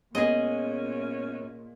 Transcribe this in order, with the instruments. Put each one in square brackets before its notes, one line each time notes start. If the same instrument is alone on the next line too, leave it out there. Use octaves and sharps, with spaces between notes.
[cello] A#2 [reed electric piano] G#3 A#3 B3 [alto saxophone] C#4 [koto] G#4 D#5